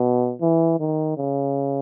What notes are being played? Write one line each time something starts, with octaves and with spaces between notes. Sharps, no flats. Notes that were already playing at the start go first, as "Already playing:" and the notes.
Already playing: B2
E3
D#3
C#3